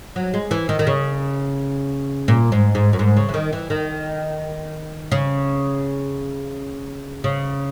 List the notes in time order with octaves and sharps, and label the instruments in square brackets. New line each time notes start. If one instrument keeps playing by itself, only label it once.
[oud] F#3
G#3
E3
D#3
D#3
C#3
A#2
G#2
G#2
F#2
G#2
C#3
E3
D#3
E3
D#3
C#3
C#3